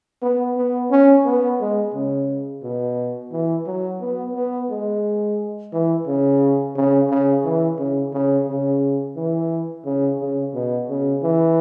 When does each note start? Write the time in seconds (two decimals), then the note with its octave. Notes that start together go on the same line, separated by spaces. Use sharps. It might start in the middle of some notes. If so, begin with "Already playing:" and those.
0.22 B3
0.57 B3
0.91 C#4
1.25 B3
1.60 G#3
1.94 C#3
2.63 B2
3.32 E3
3.66 F#3
4.00 B3
4.35 B3
4.69 G#3
5.73 E3
6.07 C#3
6.76 C#3
7.10 C#3
7.44 E3
7.78 C#3
8.13 C#3
8.48 C#3
9.16 E3
9.85 C#3
10.20 C#3
10.54 B2
10.89 C#3
11.23 E3